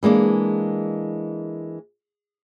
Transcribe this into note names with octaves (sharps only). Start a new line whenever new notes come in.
E3 G#3 A#3 D4